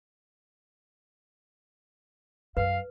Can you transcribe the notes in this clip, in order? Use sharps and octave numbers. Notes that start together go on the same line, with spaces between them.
F#2 B4 F5